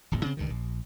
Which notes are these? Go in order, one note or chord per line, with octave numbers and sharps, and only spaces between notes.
D1 G#1 E2
C#3 C4
C#2 G2 D#3
A#1